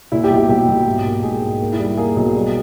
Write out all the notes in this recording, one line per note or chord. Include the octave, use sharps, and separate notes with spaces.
A#2 E4
G4
B1
G4
B1 G4
B1
G#2
A#3
G#2 G#4
G#2
A#3
E4
G3
A#3 G#4
B1
G3